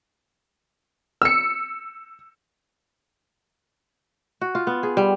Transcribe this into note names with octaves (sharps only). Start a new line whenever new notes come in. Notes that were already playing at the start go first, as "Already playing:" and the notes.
E6 C#7
F#4
F4
B3
G#4
G3